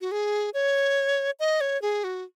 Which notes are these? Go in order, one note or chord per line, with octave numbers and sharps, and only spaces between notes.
F#4
G#4
C#5
D#5
C#5
G#4
F#4